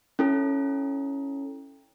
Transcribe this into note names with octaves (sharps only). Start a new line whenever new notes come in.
C#4 E4 A4